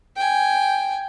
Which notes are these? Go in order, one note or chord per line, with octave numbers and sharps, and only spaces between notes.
G5 G#5